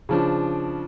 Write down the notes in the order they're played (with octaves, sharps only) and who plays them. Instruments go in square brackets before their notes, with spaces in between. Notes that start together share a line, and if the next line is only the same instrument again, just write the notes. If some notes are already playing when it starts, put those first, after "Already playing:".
[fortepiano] C#3 F3 D4